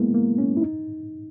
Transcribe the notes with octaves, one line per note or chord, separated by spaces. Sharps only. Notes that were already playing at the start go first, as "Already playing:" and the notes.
Already playing: G#3 A#3 B3 E4
A#3
C#4
E4
D#4